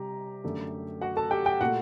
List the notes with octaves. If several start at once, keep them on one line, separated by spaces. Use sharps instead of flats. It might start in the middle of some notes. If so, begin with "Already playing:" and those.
Already playing: C3 G3 G4 A#5
F#2 D3 A3
F#4 F#5
A4 A5
G4 G5
G4 G5
A#2 A3 F#4 F#5